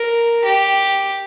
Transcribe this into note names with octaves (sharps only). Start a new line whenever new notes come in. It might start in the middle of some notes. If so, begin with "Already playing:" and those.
Already playing: A#4
G4